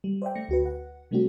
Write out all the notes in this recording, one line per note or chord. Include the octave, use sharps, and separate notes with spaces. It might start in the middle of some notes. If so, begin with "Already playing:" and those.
G3
C5 D5 E5 G5
A3 A#6 C#7
D2 F#4 B4
F#5
C3 G3 A3 C4 D4 F#4